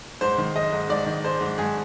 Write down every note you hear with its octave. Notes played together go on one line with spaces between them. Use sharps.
G#2 C5
D#3
G#3 D#5
G#2
G#2 D5
D#3
G#3 C5
G#2
G#2 G#4